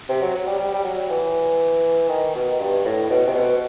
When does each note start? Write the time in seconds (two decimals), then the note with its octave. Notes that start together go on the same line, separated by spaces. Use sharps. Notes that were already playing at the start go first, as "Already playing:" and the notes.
0.09 C3
0.22 F#3
0.47 G3
0.59 G3
0.74 G3
0.84 F#3
1.10 E3
2.09 D#3
2.35 B2
2.60 G2
2.85 A2
3.10 B2
3.28 C3
3.35 B2